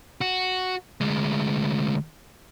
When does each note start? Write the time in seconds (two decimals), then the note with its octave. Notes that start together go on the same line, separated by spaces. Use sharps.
0.21 F#4
1.01 D2 G#3